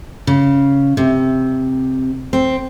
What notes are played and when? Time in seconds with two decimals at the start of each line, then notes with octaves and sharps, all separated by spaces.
0.27 C#3
0.97 C3
2.33 C4